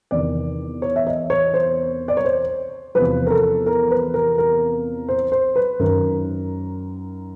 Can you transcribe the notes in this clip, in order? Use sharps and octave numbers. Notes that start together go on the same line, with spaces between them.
E2 C3 D#3 D5
C#5
E5
D#5
C#5
C5
D5
C#5
C5
E2 C3 F3 B4
A#4
A4
A#4
B4
A#4
A#4
C5
C5
B4
F#2 D#3 A#4